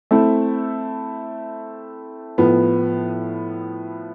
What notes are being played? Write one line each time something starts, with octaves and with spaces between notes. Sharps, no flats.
A3 C4 E4 A4
A2 F3 B3